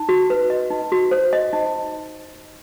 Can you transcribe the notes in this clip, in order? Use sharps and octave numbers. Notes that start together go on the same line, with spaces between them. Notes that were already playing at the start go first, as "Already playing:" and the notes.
Already playing: D#4
F#4
B4
D#5
D#4
F#4
C5
D#5
D#4